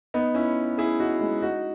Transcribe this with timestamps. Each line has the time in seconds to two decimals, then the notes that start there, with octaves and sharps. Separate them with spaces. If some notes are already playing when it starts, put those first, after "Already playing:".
0.14 B3 D#4
0.34 C#4 E4
0.78 E4 G#4
1.00 D#4 F#4
1.21 G#3
1.42 D#4 F#4